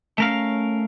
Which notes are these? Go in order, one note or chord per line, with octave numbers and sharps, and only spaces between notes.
A3 C#4 A#4 F5